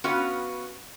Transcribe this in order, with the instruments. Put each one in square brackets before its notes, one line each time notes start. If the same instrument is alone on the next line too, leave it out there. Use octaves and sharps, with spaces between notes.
[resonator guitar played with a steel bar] B3 C#4 F#4 B4 F5 F#5